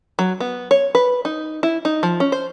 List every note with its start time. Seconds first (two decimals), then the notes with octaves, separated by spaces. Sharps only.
0.19 F#3
0.40 B3
0.71 C#5
0.95 B4
1.25 D#4
1.63 E4
1.85 D#4
2.03 F3
2.20 C#4
2.32 C5